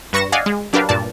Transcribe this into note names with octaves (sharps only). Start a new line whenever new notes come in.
G2 B4 C#6 A#6 C#7 E7
D5 D#5 F5 F#5 G#5
G#3
F#3 D4 G4 A#4 B4 F5
G2 A#2 D5 A5